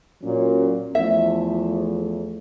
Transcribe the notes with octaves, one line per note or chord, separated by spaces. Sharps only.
A#2 F#3 C#4
E2 F3 A3 E5